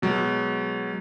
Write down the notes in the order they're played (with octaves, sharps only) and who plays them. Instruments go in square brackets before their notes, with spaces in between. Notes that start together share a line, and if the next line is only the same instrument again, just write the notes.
[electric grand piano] B2 F#3 G#3